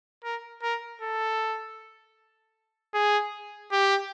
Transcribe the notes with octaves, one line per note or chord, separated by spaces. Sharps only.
A#4
A#4
A4
G#4
G4